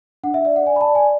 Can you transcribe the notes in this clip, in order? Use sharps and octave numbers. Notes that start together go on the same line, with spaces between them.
D4 F#5
E5
D5 E5
F#5
D5 G#5
B5
A5
D5
G#5